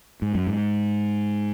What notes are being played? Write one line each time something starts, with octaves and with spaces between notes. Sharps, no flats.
G#2
F#2
G#2